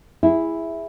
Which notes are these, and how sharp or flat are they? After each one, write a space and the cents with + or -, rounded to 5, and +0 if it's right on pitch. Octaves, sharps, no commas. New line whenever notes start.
E4 +0 G#4 -15